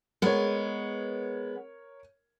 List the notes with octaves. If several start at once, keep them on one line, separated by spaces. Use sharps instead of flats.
G#3 B3 A#4 C#5